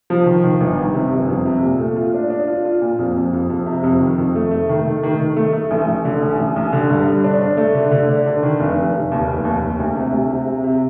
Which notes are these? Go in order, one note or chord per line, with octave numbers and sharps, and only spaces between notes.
F3
D#3
D#3
G1
D#3
C3
G1
F2
C3
A#2
A3
F4
D4
D4
F4
F4
A#2
F2
F2
F2
F2
C3
F2
D#3
F2
A3
A3
D#3
A3
D#3
D#3
A3
A3
A1
A1
D3
A1
A1
A1
D3
G2
D3
D4
D4
A3
D3
D3
D4
D3
D#3
F1
F1
F1
D#2
F1
D#2
D#2
D2
C3
D2
C3
C3
C3